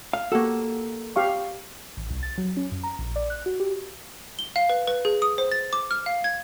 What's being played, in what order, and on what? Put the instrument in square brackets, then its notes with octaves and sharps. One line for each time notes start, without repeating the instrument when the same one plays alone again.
[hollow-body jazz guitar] F5
[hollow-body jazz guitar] A#3 A4 [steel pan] F#4 G4
[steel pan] G4 F5 C#6
[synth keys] A1
C2
A6
F#3
C#4
F#2
A#5
A#1
D5
F#6
F#4
G4
[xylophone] G7
F5
B4
B4
G#4
D#6
C5
A6
D6
F6
F5
G#6